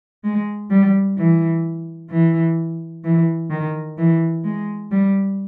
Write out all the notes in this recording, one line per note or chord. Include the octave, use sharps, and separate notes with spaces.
G#3
G3
E3
E3
E3
D#3
E3
G#3
G3